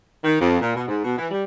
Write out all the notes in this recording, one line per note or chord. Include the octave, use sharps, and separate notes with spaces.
D#3
F2
A#2
B2
G#2
B2
E3
G3